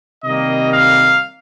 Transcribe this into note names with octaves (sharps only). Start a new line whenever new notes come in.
C3 D#3 G3 A#3 D#5
F5